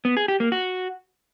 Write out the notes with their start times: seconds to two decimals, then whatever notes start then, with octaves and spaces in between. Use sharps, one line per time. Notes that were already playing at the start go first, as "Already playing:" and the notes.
0.05 B3
0.17 G#4
0.28 G4
0.40 A#3
0.52 F#4